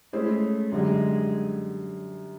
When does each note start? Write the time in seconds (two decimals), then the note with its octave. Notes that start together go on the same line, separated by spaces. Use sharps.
0.13 G#3 A3 C#4 E4 G#4 C5
0.72 F#2 D3 G3 G#3